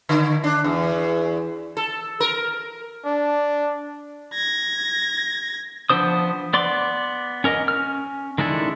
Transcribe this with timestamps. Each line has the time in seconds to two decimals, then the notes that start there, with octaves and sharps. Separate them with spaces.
0.09 D3
0.44 D4
0.64 E2
1.77 A4
2.20 A#4
3.05 D4
4.34 G#6 A#6
5.90 F3 B3 D4 C5 D#6
6.53 B3 D5 C6 D6
7.44 C#4 A#4 D#5
7.68 C#4 F6
8.38 D#3 G#3 D4 E4 A4